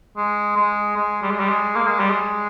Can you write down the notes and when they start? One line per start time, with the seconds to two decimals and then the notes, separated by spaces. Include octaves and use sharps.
0.17 G#3
0.56 G#3
0.96 G#3
1.22 G3
1.31 G#3
1.40 G3
1.49 G#3
1.76 A#3
1.87 G#3
1.99 G3
2.11 G#3